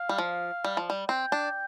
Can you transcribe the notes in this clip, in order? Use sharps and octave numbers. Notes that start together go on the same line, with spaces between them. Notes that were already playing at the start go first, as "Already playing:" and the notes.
Already playing: F5
G3
F3
G3
F3
G3
C4 G5
D4